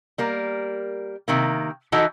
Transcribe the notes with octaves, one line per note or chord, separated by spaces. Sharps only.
G3 A#3 A#4
C3 D#3 A#3
E3 D#4 E4 F#4 A4